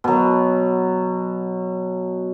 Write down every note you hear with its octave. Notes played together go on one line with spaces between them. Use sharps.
B2 F#3